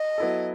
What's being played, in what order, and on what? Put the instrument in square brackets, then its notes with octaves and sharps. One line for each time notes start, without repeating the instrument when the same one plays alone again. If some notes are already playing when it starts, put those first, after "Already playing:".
Already playing: [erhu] D#5
[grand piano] F#3 B3 E4 A4